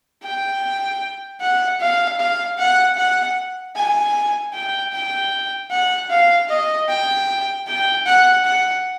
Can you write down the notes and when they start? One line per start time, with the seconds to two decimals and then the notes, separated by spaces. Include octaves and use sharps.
0.23 G5
1.41 F#5
1.80 F5
2.19 F5
2.58 F#5
2.97 F#5
3.76 G#5
4.54 G5
4.93 G5
5.71 F#5
6.10 F5
6.49 D#5
6.89 G5
7.67 G5
8.06 F#5
8.45 F#5